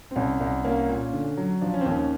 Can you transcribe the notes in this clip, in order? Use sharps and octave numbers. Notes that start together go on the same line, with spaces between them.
C4
C2 C#4
C2
A#3 C#4
A#2
D3
F#3
F3 D4
C#4
C4
D#2 C#4
C#4